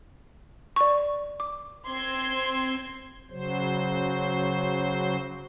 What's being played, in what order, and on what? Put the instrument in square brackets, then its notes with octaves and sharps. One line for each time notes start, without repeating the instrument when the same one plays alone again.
[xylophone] D5 C#6
D6
[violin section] C4 C6 G#6
[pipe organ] C#3 F#3 C5